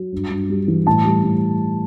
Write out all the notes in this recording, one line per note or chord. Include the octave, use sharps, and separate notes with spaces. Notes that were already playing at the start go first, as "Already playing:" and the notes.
Already playing: F#3
G2
G2
G3
E3
A2 A5
G3
A2